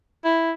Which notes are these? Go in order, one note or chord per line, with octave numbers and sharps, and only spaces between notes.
E4